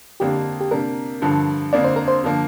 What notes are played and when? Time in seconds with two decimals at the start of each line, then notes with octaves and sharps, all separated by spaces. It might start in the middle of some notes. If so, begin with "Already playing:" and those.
0.20 F2 D3 A#3 D4 G4
0.61 G4
0.71 C3 A#3 D4 A#4
1.22 G2 D3 F3
1.73 F2 D3 A#3 D4 D5
1.84 C5
1.96 A#4
2.08 C5
2.24 D3 F3 A#3